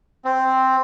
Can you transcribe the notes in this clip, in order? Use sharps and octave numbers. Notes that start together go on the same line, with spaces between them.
C4